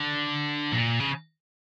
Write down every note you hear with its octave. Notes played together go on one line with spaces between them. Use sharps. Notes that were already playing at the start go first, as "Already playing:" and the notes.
Already playing: D3
A#2
C#3